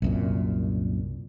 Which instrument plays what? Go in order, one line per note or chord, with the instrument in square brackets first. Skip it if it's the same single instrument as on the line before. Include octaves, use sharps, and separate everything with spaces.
[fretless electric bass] C2 F#2 A#2